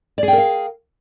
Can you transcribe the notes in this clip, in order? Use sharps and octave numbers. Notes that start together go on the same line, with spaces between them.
G#4 A#4 D5 F5 G5